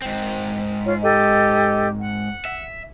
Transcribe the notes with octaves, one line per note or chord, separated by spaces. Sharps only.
G#2 C4
F4 C#5
G4 A4 D#5
F#5
E5